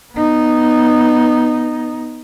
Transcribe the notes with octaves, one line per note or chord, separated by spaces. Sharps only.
B3 D#4